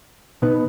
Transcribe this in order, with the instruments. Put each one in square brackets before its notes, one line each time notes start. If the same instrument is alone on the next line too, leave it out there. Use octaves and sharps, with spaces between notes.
[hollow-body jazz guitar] B2 B3 D#4 B4